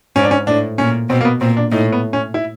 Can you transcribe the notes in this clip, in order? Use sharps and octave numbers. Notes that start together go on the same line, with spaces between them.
G#2 C#4
D4
C#4
A2 D4
A#2 C#4
B2 C4
A#3
B3
A#2 C4
D4
A2 D#4
B3
C#4
E4